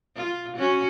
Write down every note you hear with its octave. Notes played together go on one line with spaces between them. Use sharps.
F4
C#4 F#4